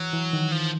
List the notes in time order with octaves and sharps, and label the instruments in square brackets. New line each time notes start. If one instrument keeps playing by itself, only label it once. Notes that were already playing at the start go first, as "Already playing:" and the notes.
Already playing: [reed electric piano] E3 [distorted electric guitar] F#3
[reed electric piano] E3
D#3
[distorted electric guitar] F3